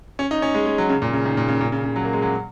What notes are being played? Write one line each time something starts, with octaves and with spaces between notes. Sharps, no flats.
C#4
D#4
C#4
G#3
G#3
F#3
C#3
A#2
C#3
D#3
A#2
C#3
A#2
C#3
C#3
F#3
A#3
G#3
F#3